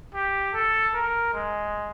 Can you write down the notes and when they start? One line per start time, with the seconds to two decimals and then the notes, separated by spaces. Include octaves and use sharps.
0.15 G4
0.54 A4
0.95 A#4
1.34 G#3